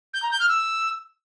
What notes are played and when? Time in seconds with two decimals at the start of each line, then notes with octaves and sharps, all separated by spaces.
0.14 G6
0.22 A#5
0.31 G6
0.40 F6
0.49 E6